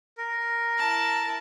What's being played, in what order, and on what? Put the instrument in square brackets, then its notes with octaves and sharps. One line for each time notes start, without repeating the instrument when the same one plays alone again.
[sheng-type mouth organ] A#4
[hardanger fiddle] E4 A5